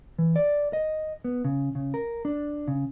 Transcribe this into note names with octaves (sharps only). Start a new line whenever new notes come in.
E3
D5
D#5
B3
C#3
C#3
A#4
D4
C#3